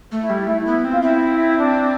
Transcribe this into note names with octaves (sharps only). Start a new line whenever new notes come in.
A3
E4
G3
A3 E4
E4
B3
C4 F4
C4 E4
D4